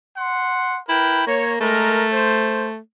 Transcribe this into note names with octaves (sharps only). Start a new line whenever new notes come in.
F#5 C6
E4 A#4 B4 G5
A#3 C#5
G#3 A3 A#4
C5